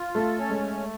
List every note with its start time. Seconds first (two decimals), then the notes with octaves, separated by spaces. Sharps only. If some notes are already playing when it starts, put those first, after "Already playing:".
Already playing: F4
0.15 A3 A4
0.39 C#4
0.50 G#3
0.61 A3